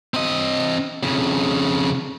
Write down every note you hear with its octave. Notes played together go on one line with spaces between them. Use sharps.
C4 D#5
F2 C#3